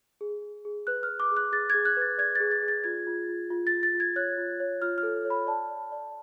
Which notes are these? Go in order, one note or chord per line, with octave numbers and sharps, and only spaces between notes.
G#4
G#4
G#4
B4 F#6
F6
B4
D6
G#4
F#6
G#4 A6
G#6
G#4
F#6
B4 A6
D5 G#6
A6
G#4
A6
G#4
A6
F4 G#6
F4
F4
F4
A6
F4
A6
F4
G#6
C#5 F#6
F4
C#5
F4 F6
F6
A4
C#5
B5
D5 A5
D5
D5